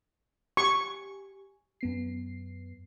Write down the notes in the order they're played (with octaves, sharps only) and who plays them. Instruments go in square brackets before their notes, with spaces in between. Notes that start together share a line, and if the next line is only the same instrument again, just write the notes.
[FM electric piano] G4 G#5 [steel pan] C#6
[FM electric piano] F#2 B3 C7